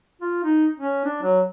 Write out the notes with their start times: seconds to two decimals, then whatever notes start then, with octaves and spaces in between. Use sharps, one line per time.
0.22 F4
0.44 D#4
0.78 C#4
1.05 D4
1.23 F#3